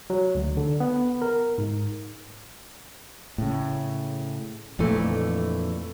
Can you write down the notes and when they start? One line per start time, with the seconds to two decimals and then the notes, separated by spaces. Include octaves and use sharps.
0.10 F#3
0.35 D2
0.57 D3
0.80 B3
1.22 A#4
1.58 G#2
3.38 A2 C#3
4.79 F2 A#2 D3 E3 A3